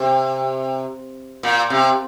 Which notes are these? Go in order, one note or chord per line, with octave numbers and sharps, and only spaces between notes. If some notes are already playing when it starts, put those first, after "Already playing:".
Already playing: C3
A#2
C3